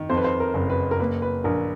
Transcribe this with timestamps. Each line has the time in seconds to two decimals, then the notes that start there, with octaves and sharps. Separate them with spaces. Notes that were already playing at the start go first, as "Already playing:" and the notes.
Already playing: D#3
0.10 F2 C5
0.17 B4
0.24 C5
0.40 A#4
0.54 F#1
0.70 B4
0.91 A#4
0.99 A#3 B4
1.22 B4
1.44 A#1 A#4